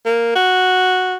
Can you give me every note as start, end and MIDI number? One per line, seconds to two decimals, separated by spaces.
0.05 0.31 58
0.35 1.17 66